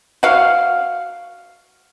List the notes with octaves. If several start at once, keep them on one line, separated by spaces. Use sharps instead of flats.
F#4 F5